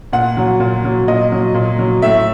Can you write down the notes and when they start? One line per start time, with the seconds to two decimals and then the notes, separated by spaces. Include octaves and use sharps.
0.13 A#2 F#5
0.37 F#3
0.60 A#2
0.85 F#3
1.08 A#2 D#5
1.32 F#3
1.54 A#2
1.79 F#3
2.02 A2 E5